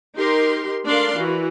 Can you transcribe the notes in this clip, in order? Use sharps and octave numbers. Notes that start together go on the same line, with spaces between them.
D#4 G4 A#4 C6
A3 D4 A#4 D5 F5 C6
E3 F#4